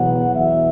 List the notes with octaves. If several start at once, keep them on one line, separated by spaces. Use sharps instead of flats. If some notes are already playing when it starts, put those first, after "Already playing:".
Already playing: E2 B2 F#3 B3 F#5
E2 B2 F#3 E5